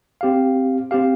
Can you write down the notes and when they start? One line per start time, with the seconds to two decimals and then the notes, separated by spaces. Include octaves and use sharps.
0.21 C4 G4 F5
0.91 C4 G4 F5